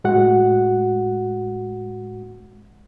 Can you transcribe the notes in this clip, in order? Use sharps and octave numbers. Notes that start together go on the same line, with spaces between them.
A2 G#3 F#4 F#5